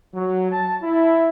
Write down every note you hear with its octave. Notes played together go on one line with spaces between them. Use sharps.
F#3
A5
E4